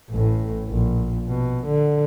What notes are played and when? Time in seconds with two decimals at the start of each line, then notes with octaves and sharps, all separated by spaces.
0.10 A1 A2
0.69 A#1
1.28 B2
1.68 D3